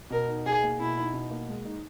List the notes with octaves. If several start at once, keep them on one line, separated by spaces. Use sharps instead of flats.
B2 A#4
D#4
B2 G#4
A#3
B2 E4
D#4
B2
A#3
G#3
D#4